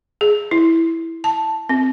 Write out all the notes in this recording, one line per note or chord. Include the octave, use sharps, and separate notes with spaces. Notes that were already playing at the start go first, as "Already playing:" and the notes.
G#4
E4
A5
C4